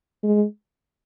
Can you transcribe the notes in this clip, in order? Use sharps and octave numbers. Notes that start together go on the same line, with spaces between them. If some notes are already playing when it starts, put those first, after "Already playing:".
G#3